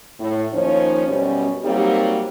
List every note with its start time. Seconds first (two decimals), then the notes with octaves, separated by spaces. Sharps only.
0.19 A2
0.52 D#2 F3 C#4 D#4 C5 C#5
1.08 F#2 B2 G3 C#4
1.63 F#3 G3 A#3 C4 D#4 G4